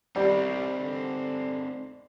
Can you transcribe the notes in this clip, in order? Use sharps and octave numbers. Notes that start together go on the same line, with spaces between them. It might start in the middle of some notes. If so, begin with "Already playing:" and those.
C2 G3 C4 D#4 D5
D3